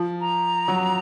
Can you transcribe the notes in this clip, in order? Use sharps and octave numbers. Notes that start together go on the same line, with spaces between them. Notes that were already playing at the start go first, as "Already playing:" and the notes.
Already playing: F3
A#5
F#3